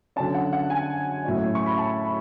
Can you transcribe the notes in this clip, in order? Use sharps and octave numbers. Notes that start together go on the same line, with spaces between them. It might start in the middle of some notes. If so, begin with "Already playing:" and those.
D3 F#3 C#4 A5
F#5
F#5
G#5
A2 F#3 C#4
C#6
B5
A5
B5